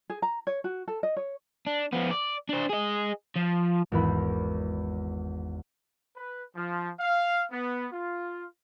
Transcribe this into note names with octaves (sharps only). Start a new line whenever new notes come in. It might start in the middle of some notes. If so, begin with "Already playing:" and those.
G#4
A#5
C#5
F#4
A4
D#5
C#5
D4
F3 B3
D5
D4 C5
G#4 D#5
F3
G#1 E2 B5
B4
F3
F5
B3
F4